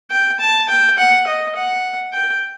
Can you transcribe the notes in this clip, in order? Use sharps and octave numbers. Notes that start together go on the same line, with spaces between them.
G5
A5
G5
F#5
D#5
F#5
G5